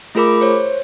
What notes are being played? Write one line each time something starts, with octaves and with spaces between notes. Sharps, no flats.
A3 F4 G#4 A#4 B5 D6
C5 C#5